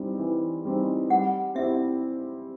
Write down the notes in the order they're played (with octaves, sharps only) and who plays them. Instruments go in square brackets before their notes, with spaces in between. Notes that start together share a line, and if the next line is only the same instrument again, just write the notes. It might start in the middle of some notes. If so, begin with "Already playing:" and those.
Already playing: [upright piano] E3 G3 C4 D#4
E3
G3 C4 D#4
[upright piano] G3 [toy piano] F#5
[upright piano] C4 E4 G4 [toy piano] E5